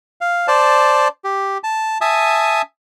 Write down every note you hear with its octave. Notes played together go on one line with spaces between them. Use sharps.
F5
C5 D5 A5
G4
A5
E5 G#5 A5 D#6